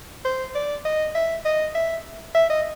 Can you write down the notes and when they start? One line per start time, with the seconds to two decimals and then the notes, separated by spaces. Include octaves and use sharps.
0.25 C5
0.55 D5
0.85 D#5
1.15 E5
1.45 D#5
1.75 E5
2.35 E5
2.50 D#5